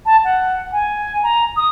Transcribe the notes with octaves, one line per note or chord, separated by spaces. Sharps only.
A5
F#5
G#5
A#5
D#6